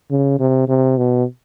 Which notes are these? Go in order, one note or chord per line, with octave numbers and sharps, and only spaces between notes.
C#3
C3
C3
B2